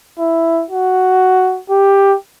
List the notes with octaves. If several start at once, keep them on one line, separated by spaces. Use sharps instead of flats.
E4
F#4
G4